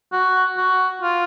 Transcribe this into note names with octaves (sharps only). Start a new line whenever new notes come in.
F#4
F#4
F4